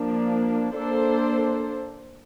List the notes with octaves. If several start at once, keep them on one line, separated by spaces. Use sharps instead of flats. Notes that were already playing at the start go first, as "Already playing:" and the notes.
Already playing: F3 A#3 D4
A#3 D4 A4 C5